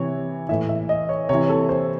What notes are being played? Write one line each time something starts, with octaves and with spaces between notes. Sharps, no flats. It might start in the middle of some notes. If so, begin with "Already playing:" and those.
Already playing: C3 E3 C#5
A2 E3 E5
E5
D#5
C#5
C3 E3 C#5
A4
C5